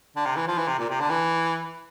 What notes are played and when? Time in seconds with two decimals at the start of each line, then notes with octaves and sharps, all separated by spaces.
0.16 D3
0.26 C3
0.36 E3
0.48 F3
0.58 E3
0.68 C3
0.79 A#2
0.90 C3
1.00 D3
1.10 E3